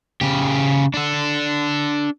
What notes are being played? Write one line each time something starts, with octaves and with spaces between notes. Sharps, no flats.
C#3 G4
D4 A4